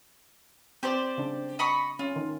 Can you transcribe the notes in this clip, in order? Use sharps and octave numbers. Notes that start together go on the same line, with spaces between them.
C4 G4 C5 D5
C#3 D4
D#5 B5 C#6
C#4 F4
D#3